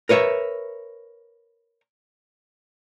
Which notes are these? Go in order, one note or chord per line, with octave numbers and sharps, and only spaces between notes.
A#4 B4 C#5 E5